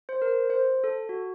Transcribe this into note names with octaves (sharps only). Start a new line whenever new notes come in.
C5
A#4
C5
A4
F#4